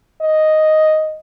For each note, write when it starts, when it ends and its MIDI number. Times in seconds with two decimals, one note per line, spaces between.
0.21 1.18 75